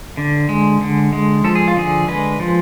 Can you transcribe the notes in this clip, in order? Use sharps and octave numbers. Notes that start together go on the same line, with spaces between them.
D3
G#3
D3
G#3
F3 A4
G#4
F4
D3 G#4
G#3 B4
F3